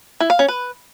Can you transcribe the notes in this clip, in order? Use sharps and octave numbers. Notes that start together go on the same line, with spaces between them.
E4
F5
C#4
B4